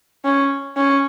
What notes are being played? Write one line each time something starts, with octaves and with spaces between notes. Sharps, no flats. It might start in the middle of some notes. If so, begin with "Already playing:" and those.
C#4
C#4